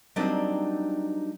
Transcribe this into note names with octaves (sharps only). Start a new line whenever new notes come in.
F#3 G3 A#3 C4 D4 D#4